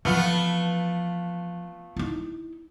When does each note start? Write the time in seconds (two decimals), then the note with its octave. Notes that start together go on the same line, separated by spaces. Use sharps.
0.05 E3 F3 A3 B3 F4
1.96 D#4 E4